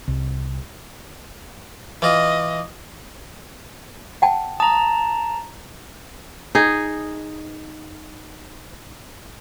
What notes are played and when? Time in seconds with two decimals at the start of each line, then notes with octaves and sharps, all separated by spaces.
0.08 C2
2.02 E3 F4 D#5
4.22 F#5 G5 A5
4.60 A5 A#5 D#6
6.55 D#4 G#4